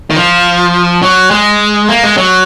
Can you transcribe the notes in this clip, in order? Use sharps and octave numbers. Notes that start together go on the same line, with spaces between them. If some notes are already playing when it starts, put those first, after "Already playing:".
D#3
F3
F#3
G#3
A#3
G#3
F#3